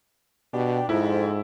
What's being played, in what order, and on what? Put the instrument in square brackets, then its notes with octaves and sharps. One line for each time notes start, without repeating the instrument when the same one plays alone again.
[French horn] B2 [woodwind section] D4 G4
[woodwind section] F2 [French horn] G#2 [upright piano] E4